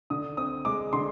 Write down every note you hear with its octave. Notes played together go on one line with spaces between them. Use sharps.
D3 D#6
C4 D#6
G#3 D6
D3 C6